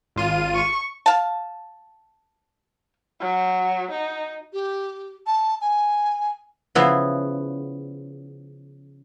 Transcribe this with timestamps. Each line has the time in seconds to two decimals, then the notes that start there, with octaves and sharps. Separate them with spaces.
0.16 G#1 F4 D#7
0.55 C#6
1.06 F5 A5
3.20 F#3
3.91 D#4
4.53 G4
5.27 A5
5.61 G#5
6.75 C#3 F3 B3 E4 F#4